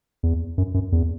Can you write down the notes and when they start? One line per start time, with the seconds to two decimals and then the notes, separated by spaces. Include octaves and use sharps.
0.23 E2
0.58 F#2
0.74 F#2
0.92 E2